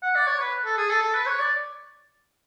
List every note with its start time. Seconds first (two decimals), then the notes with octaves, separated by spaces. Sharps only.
0.02 F#5
0.15 D5
0.27 C#5
0.40 B4
0.65 A4
0.77 G#4
0.89 A4
1.02 A4
1.14 B4
1.26 C#5
1.39 D5